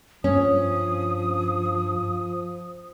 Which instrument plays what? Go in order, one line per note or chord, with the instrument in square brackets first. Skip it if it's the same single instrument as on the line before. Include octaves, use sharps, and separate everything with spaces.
[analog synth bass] G2 [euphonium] F3 [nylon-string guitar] C#4 [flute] D#6